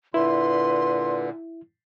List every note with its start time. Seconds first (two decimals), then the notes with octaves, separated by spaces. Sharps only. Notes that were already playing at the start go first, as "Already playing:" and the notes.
0.14 A#2 D3 E4 B4 C6